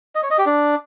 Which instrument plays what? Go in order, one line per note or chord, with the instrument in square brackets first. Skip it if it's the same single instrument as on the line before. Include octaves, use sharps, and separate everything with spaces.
[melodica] D#5
C#5
D#5
G4
D4